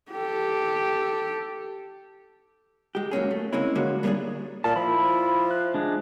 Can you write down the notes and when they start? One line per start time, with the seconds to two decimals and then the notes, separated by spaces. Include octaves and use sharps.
0.12 G4 A4
2.95 G#3 G4
3.11 F#3 A#3 C#4 G#4
3.31 A3
3.53 C#3 G#3 A#3 C4 C#4 E4
3.75 D3 F3 G#3 A#3 C#4 F#4
4.03 G3 A#3 B3 C#4 D4 G#4
4.64 A#2 A5
4.76 F3 E4 B5
5.51 F#6
5.74 G#3 D4